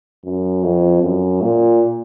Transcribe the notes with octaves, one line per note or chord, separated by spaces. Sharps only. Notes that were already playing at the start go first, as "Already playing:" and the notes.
F#2
F2
F#2
A#2